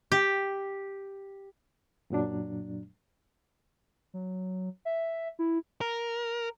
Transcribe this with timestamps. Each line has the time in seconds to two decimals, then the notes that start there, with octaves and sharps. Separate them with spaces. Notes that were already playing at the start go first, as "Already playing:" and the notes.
0.12 G4
2.10 F#2 A#2 F#3 D4
4.14 F#3
4.85 E5
5.39 E4
5.81 A#4